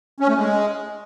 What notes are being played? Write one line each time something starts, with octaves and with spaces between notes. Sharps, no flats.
C#4
A3
G#3